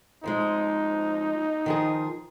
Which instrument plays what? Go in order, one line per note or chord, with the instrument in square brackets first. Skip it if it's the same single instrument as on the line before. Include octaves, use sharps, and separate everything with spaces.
[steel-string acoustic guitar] F2 F3 G#3 [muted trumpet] D#4
[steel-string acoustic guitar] D#3 F3 G#4